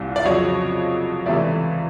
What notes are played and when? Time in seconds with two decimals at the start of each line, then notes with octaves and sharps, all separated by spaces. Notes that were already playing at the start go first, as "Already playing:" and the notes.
Already playing: C2 A#2 C4
0.16 D5
0.24 F2 C#3 F#3 C#5 D#5
1.26 C#2 C3 E3 A3 D5 E5